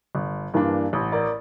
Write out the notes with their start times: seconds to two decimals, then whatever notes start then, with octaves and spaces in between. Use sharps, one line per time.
0.15 G1
0.54 G2 E3 A#3 D4
0.93 A1
1.12 A#4 D5